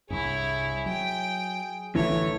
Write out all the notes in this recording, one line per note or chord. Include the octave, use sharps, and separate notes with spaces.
C2 G2 E4 G#4 C#5
F#3 G5
A1 D2 D3 E3 A3 C#5